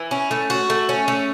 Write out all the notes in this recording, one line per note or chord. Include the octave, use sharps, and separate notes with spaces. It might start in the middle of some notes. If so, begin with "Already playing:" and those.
Already playing: E3
C#4
A3
F#4
A3
C#4
A3